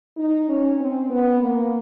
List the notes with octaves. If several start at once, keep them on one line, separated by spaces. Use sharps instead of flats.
D#4
C#4
C4
B3
A#3